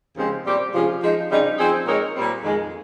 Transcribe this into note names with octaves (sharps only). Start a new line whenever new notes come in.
D#2 C#3 F3 G#3 C4
A#2 G3 C4 G4
C3 F3 G#3 C#4 F4
F3 G#3 D#4
C#3 G3 C4 D#4
F3 C4 D#4 G#4 C5
A#2 G#3 D#4 A#4 C#5
A#2 G3 C4
F2 D#3 G#3